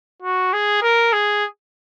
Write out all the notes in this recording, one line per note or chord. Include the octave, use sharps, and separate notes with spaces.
F#4
G#4
A#4
G#4